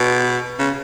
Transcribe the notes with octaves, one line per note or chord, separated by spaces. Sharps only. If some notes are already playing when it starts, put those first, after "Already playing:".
Already playing: B2
C#3